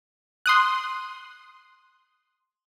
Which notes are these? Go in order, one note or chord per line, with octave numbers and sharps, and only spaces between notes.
C6 D#6 F#6